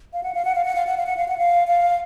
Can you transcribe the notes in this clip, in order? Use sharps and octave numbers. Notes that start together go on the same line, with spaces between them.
F5
F#5
F5
F#5
F5
F#5
F5
F#5
F5
F#5
F5
F#5
F5
F5